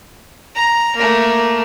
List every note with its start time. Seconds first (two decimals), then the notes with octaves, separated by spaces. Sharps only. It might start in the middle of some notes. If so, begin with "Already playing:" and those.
0.55 A#5
0.96 A3 A#3